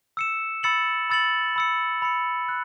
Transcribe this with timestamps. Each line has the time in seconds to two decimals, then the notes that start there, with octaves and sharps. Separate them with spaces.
0.17 E6 C#7 E7
0.63 B5 E6 A6 C#7 F#7
1.10 B5 E6 A6 C#7 F#7
1.56 B5 E6 C#7
2.02 B5 E6 C#7
2.49 F#6